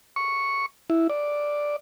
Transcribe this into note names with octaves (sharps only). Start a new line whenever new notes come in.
C#6
E4
D5